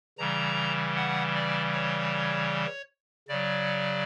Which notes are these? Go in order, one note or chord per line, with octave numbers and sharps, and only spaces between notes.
C#3 E3 G3 A#5
F#5
D5
C#5
C#3 F#3 D5